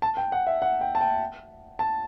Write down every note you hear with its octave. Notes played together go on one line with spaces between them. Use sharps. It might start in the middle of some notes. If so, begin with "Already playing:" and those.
A5
G5
F#5
E5
F#5
G5
A5
G5
A5